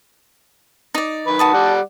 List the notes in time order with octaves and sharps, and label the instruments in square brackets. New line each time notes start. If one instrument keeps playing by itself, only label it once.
[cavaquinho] D#4 D5
[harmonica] D#3 B4
[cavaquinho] F#4 A5 D#6
[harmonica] G3 D5 F#5